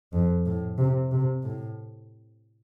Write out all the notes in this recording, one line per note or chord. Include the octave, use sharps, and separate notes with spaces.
F2
A2
C3
C3
A2